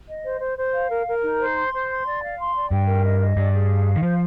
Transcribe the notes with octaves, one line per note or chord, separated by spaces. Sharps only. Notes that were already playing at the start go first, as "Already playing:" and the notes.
D#5
C5
C5
C5
F5
A#4
A#4
D#4
C5
C6
C5
C6
D5
F5
C6
D5
G2 G5
A#4
D#5
D#5
G2 D5
G#4
F5
F5
D#3
F3 C5